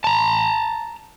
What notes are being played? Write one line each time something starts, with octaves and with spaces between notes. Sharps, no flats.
A5 A#5